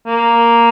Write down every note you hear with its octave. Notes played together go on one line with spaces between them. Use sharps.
A#3